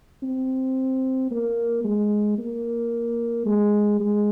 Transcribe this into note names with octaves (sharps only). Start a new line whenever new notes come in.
C4
A#3
G#3
A#3
G#3
G#3